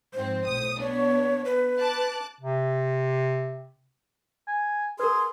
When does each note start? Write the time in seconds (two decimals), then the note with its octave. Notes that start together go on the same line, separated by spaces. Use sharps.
0.14 G#2 F3 C4 C5
0.47 B1 A2 D#6
0.80 B3 D4 C#5
1.45 B4
1.79 A5 D6 F#6
2.41 C3
4.48 G#5
5.00 G#4 A#4 B4 C6